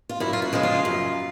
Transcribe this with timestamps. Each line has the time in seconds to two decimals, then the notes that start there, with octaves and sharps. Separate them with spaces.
0.09 F4
0.20 F#2 E4
0.33 F4
0.42 F#4
0.53 C#3 F3 G#3
0.63 F4
0.85 F#2